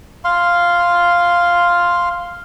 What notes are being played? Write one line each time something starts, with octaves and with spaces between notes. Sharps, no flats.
F5 C6